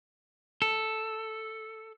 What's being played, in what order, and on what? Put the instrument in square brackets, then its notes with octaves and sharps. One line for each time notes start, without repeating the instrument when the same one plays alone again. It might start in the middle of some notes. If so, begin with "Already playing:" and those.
[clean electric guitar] A4